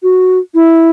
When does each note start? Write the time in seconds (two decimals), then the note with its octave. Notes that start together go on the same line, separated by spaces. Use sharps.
0.03 F#4
0.55 E4